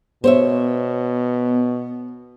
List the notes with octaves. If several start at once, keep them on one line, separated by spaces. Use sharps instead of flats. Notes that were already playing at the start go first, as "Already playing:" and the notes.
B2 B3 C5 C#5 E5